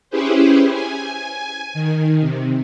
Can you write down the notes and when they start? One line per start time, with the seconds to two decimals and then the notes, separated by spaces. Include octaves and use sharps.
0.10 C#4 E4 G4 G#4 B4 C5
0.70 G#5
1.74 D#3
2.21 C3